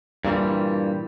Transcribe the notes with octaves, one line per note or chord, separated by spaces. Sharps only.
G2 A#2 E3 G3